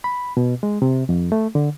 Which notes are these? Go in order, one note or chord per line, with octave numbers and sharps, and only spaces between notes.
B5
B2
G#3
C3
F2
A3
D3